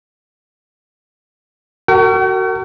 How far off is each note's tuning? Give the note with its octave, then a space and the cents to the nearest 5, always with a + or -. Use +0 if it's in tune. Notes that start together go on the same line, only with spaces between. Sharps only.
F#4 +20 A#4 -40 G5 -45